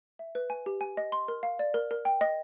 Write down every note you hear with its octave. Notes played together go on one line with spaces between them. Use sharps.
E5
B4
G#5
G4
G#5
D#5
C6
A#4
F5
D5
A#4
A#4
G5
D#5